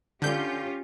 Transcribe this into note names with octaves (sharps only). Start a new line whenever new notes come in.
D3 C#4 F4 G4 G6